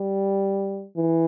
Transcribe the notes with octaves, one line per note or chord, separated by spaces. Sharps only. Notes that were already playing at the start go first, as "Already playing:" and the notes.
Already playing: G3
E3